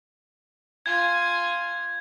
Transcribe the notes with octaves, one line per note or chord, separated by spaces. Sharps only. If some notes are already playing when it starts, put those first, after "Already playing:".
F4 G#5 G#6